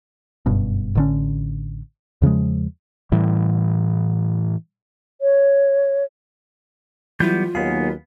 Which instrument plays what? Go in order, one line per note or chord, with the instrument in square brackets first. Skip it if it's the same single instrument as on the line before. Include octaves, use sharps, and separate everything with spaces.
[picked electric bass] F#1 G2 B2
A1 D3 C#4
E2 C#3 F3 G#3
[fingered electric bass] A2 E3 G3
[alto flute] C#5
[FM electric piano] E3 F#3 E4 [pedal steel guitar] G3 B3 G6 [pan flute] F4
[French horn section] D#2 F#3 [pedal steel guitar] B3 G#4 [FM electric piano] F5